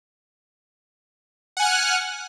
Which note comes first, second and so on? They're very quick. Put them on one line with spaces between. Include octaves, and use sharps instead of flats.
F#5 G#5 F#6 F6